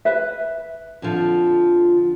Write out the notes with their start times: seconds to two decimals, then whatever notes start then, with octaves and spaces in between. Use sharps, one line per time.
0.05 B4 E5
1.02 F2 D3 F3